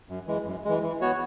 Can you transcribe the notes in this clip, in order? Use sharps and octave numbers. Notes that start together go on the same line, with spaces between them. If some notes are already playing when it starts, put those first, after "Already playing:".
F#2
E3 G#3
F#2
E3 G#3
E3
B3 F#4 C#5